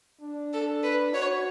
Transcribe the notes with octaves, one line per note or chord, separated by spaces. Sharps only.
D4
A4
B4
F#4 C#5